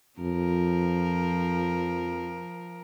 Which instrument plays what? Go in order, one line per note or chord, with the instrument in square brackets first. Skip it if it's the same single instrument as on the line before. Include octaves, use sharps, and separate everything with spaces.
[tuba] F2 [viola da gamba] F3 A#4